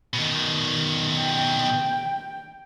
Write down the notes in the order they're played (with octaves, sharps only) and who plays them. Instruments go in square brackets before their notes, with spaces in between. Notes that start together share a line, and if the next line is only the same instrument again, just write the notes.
[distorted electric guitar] B2 D#3
[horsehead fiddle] G5